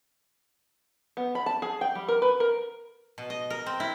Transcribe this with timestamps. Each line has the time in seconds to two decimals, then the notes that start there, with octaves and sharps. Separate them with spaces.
1.17 B3
1.35 B5
1.46 A5
1.62 G#4
1.81 G5
1.95 G3
2.08 A#4
2.22 B4
2.40 A#4
3.18 B2
3.30 D#5
3.50 A#4
3.66 C4
3.80 E4